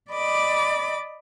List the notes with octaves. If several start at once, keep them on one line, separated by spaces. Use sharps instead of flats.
D5 D#5 B5 D6